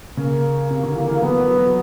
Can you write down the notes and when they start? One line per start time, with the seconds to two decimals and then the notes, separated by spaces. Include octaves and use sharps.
0.17 C#3 A#3
0.70 C3
0.83 D3
0.96 E3
1.09 E3
1.22 F#3 B3
1.40 F#3
1.57 F#3